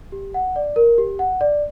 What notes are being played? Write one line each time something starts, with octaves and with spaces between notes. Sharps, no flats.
G4
F#5
D5
A#4
G4
F#5
D5